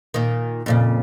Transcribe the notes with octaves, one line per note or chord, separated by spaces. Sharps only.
A#2 D#3
F2 A#2 C#3